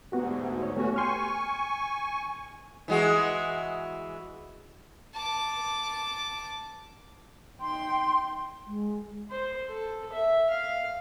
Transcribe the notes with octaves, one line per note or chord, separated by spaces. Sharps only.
D2 G#2 B3 F#4 G4
C#5
A3 B3 C#4 F#4 G4
G5 G#5 C6 C#6 F6
E3 G#3 F#4
A5 D6
D#4 G5 C6
G#3
C5
A4
E5
F5